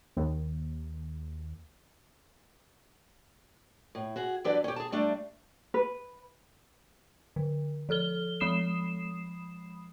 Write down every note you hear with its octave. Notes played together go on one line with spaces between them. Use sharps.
D#2
A2
F#4 G#4
E3 F#3 D4 G4 B4 D5
C#4 G4
G#4 A5
G3 A3 D4
B4
D3
F3 A4 F6 G7
F3 G#3 B5 D#6 C7 E7